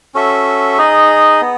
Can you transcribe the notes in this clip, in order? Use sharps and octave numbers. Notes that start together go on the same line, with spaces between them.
C#4 F#4 A4 E5
D#4 G#4 D#5
B3